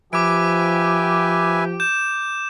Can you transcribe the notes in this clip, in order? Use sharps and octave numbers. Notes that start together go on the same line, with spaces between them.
F3 G4 B4 E5 G#5 D6 D7
G6 E7